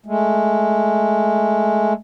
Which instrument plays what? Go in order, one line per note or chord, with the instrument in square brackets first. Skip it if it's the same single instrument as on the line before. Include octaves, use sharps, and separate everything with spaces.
[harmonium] G#3 A3